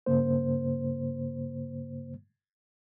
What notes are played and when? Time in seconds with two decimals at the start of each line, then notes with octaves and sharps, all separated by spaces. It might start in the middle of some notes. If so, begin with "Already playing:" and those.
0.06 G2 C#3 A#3 C5